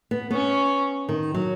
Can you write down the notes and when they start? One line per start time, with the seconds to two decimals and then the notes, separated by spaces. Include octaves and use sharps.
0.11 B3
0.31 B3 C#4
1.09 D#3
1.34 F#3